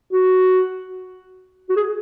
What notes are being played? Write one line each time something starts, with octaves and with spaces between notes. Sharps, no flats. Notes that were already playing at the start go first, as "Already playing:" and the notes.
F#4
F#4
G#4